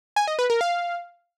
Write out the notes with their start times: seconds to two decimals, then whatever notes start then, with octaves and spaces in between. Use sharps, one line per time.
0.16 G#5
0.28 D#5
0.39 B4
0.50 A#4
0.61 F5